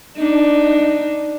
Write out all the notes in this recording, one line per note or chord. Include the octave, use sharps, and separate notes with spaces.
D4 D#4